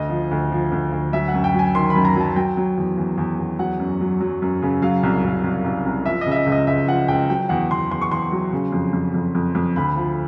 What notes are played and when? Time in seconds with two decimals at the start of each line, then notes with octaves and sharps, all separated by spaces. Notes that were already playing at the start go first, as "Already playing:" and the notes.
Already playing: D2 D#5
0.10 F3
0.31 D2
0.52 F3
0.72 D2
0.92 D2
1.13 F#3 E5
1.28 F#5
1.34 F#2
1.44 G5
1.54 F#3 G#5
1.75 D#3 C6
1.90 B5
1.96 F#2
2.05 A#5
2.16 F#3 A5
2.36 F#3 G5
2.57 F#3
2.78 E2
2.98 E2
3.18 E2
3.39 E2
3.59 F#3 F#5
3.79 F#2
4.01 F#3
4.21 F#3
4.42 F#2
4.62 C#3
4.82 F#3 F5
5.03 C2
5.24 C2
5.44 C2
5.64 C2
5.86 C2
6.06 F3 E5
6.21 D#5
6.27 C#3 E5
6.36 D#5
6.46 C#2
6.52 D#5
6.67 C#2 E5
6.88 F3 F#5
7.08 C#2 G5
7.29 F#3 G5
7.49 E2 F#5
7.71 E2 C6
7.91 E2 C6
8.02 C#6
8.11 E2 C6
8.32 F#3
8.53 C#3
8.72 F2
8.93 F2
9.14 F2
9.35 F2
9.55 F2
9.76 D2 B5
9.96 F3